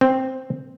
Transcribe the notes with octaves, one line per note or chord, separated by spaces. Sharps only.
C4